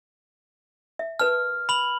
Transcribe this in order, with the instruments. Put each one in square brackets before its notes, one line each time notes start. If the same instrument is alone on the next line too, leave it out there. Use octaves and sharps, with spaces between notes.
[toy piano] E5
[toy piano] A#4 B4 A5 [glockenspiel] F6
[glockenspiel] B5 F#7